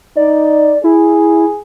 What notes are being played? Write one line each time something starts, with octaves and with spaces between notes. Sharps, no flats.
D#4 D5
E4 G#4